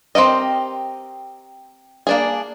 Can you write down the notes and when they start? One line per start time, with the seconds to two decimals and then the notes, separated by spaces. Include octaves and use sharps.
0.15 C4 G4 A#4 D#5
2.07 A#3 D4 G#4